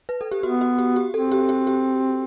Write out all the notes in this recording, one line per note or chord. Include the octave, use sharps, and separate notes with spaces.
B4
A4
G4
B3 F#4
F#4
G4
G4
C4 A4
G4
G4
G4